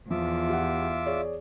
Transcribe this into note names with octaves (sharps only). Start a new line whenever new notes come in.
E2 F3 F4 E5 D6
G4 F#5
G#4 C#5 D5